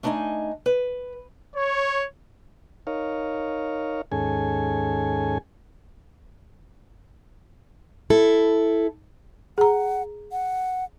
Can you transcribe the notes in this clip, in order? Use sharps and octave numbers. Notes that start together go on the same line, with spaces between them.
A3 D4 D#4 D#5 G#5
B4
C#5
D#4 A#4 C#5 F5
D#2 G#2 C#4 G#4 A4 G#5
E4 A4
G#4 F#5 A#5
F#5